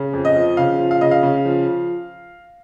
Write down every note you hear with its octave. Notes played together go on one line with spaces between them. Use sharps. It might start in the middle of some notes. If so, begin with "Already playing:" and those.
Already playing: C#3
F2
D#5
F3
C#3 F5
F3
F5
C#3 D#5
F5
C#3
F3